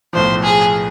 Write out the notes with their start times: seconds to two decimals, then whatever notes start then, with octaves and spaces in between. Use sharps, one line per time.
0.13 B1 A2 F3 C5
0.43 G#4